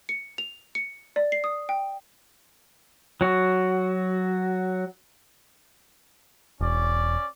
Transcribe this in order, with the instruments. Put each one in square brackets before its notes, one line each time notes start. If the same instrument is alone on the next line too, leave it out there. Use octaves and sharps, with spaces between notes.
[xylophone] C#7
F7
C#7
D5
C7
D#6
G5
[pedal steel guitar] F#3 F#4
[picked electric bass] E1 [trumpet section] C#4 D5